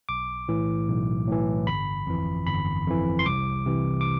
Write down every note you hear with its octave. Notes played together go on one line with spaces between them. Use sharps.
B1 D6
A2 E3
B1
A2 E3
G1 B5
F2 E3
G1 B5
F2 E3
C6
C2 D6
C3 E3
D6